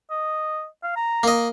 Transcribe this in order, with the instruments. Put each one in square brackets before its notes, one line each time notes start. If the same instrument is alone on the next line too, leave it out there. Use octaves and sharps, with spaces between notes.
[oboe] D#5
F5
A#5
[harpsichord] A#3 D#5